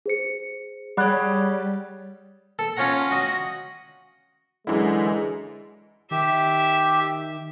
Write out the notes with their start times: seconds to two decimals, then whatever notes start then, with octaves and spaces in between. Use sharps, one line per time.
0.06 G#4 C5 C#7
0.97 G3 G4 G#4 C#5 F#5 B5 F#6
2.59 A4
2.77 C#4 F4 C#5 F#5 A#5
3.11 F#4 D#5 F#5
4.67 F#2 D3 E3 G#3 E4
6.11 D#3 G4 E5